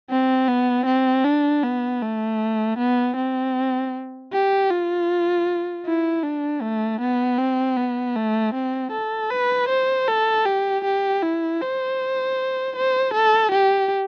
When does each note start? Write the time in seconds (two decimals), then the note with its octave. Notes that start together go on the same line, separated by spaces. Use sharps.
0.10 C4
0.48 B3
0.86 C4
1.24 D4
1.64 B3
2.02 A3
2.79 B3
3.16 C4
4.32 G4
4.71 F4
5.86 E4
6.23 D4
6.62 A3
7.01 B3
7.38 C4
7.77 B3
8.16 A3
8.54 C4
8.92 A4
9.30 B4
9.69 C5
10.08 A4
10.46 G4
10.85 G4
11.23 E4
11.61 C5
12.76 C5
13.14 A4
13.52 G4